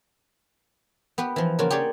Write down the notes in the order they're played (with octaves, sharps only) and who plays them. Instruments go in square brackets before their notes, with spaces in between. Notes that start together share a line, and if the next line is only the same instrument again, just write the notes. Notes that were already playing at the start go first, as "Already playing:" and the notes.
[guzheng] B3 G4 B4
E3 F3
C#3 A#3 F4 F#4
G4 G#4 C#5 D5